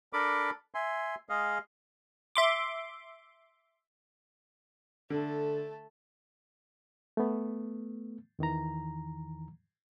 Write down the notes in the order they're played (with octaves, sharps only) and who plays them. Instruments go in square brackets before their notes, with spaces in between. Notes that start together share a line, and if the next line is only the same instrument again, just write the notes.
[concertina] D4 A4 A#4 B5 D6
E5 G#5 C6
G#3 G#4 D#5 F5
[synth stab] E5 C6 D6
[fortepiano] D3 [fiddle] A3 A4
[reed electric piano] A3 B3
E2 D#3 E3 A#5